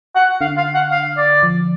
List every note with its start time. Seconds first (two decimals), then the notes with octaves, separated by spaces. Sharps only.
0.16 F#5
0.41 D3 F5
0.57 F5
0.75 F#5
0.92 F5
1.17 D5
1.43 F3